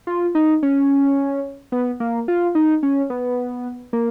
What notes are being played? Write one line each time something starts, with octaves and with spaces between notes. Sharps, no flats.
F4
D#4
C#4
B3
A#3
F4
D#4
C#4
B3
A#3